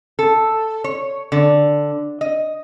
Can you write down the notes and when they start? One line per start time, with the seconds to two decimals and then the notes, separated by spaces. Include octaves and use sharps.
0.19 A4
0.84 C#5
1.32 D3
2.21 D#5